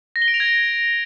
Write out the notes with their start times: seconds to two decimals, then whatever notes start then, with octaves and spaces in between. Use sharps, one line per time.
0.16 A#6
0.22 G7
0.28 D7
0.34 F7
0.40 G#6